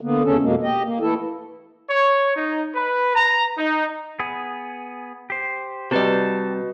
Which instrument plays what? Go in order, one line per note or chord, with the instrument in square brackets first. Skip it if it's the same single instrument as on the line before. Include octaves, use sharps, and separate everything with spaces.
[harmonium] D3 A#3 B3
E2 C#3 A3 C#4 A4
F2 B2 G#3 A#3
G4 D#5
A#3
E3 A3 E4 A4
[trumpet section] C#5
D#4
B4
A#5
D#4
[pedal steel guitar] B3 G#4
G4 C5
[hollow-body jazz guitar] C3 G3 [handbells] F#4 B4 D#5 [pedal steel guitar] G4 A5